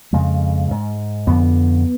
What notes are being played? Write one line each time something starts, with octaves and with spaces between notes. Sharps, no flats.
F2 C#3 G#3
G#2
F2 D3 B3